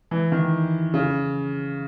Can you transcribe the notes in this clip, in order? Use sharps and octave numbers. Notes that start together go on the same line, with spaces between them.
E3
D#3
C#3